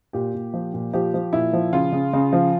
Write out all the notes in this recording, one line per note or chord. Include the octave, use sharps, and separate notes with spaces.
A#2 G4
A#2
F3
A#2
F3 G4
F3
A#2 E4
F3
C#3 F4
C#3
C#3
F3